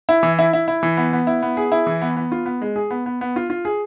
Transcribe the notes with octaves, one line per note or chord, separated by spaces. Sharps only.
E4
E3
E4
E4
E4
E3
B3
B3
E4
B3
G#4
E4
E3
B3
B3
F4
B3
G#3
G#4
B3
B3
B3
F4
F4
G#4